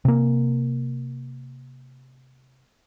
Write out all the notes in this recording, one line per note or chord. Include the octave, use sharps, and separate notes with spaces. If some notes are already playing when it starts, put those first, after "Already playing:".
C3 A#3